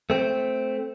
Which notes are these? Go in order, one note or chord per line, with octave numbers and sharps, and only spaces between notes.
A3 C4